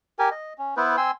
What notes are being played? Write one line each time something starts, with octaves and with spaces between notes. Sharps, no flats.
G4 A#4 G#5
D#5
C#4
B3 E4 B4 C5
C4 G#5 C6 E6